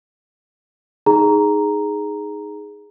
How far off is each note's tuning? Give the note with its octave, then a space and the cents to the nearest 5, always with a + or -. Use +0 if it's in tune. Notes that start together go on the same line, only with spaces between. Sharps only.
D#4 +0 G#4 +0 A#5 +0